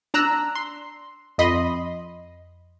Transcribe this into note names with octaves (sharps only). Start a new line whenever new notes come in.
D4 A#5 E6 F#6
C6
F2 D#5 B5 C6